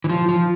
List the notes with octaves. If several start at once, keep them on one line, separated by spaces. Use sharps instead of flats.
E3
F3
F3